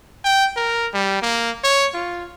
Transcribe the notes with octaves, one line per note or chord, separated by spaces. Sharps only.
G5
A#4
G3
A#3
C#5
F4